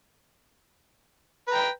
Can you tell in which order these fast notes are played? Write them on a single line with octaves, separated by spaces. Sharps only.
B4 A#5 G5